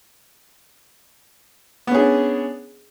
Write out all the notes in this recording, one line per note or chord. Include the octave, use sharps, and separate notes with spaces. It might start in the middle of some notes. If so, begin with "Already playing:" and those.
B3 C#4 D4 G#4